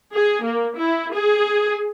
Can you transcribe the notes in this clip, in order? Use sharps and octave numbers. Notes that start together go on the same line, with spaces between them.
G#4
A#3
E4
G#4